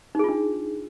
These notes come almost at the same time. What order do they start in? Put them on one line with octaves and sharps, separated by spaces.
D#4 G#4 F4 D4